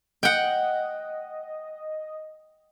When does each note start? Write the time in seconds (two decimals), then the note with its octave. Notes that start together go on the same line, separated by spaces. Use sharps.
0.23 D#5 F#5 G5